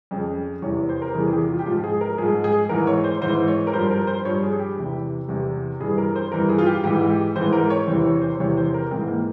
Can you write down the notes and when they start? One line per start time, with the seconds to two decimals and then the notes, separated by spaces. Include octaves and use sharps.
0.11 F2 C#3 F3
0.62 E2 C3 E3 C#5
0.89 C5
1.02 A#4
1.14 E2 C3 E3 G#4
1.27 G#4
1.32 G4
1.49 F4
1.59 G4
1.66 G#2 F3 F4
1.84 G#4
2.01 A#4
2.18 F3 G#4
2.22 G#2
2.44 G#4
2.69 G#2 E3 A#4
2.87 C#5
3.04 C5
3.21 G#2 E3 C5
3.48 C#5
3.67 A#4
3.73 G2 F3 C5
3.91 A#4
4.07 C5
4.25 G2 F3 C#5
4.43 G#4
4.59 G4
4.77 E2 C3 E3
5.28 E2 C3 E3
5.80 G2 E3 G#4
5.98 A#4
6.16 C5
6.32 G2 E3 A#4
6.49 G#4
6.58 F4
6.66 G4
6.84 G#2 E3 G4
7.10 G4
7.36 G#2 E3 C5
7.53 A#4
7.70 C#5
7.87 E2 C3 E3 C5
8.05 C#5
8.22 C5
8.40 E2 C3 E3 C#5
8.57 C5
8.74 A#4
8.91 G#2 E3 C4
9.08 A#3